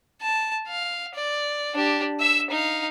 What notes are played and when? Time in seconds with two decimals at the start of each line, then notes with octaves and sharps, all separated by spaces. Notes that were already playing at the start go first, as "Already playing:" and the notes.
0.22 A5
0.68 F5
1.15 D5
1.75 D4 G4
2.20 E5 E6
2.50 D#4 F5